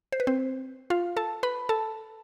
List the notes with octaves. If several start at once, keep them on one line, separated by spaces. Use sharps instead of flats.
C5
B4
C4 C5
F4 F5
A4 A5
B4 B5
A4 A5